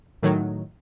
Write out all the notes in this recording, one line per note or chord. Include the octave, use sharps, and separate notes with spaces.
A2 D#3 F#3